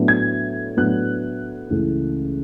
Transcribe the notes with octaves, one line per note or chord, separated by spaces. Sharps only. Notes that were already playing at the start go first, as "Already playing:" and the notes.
Already playing: A2 F#3 B3 D4
G#6
A2 F#3 B3 D4 F#6
C#2 C#3 E3 A3 E4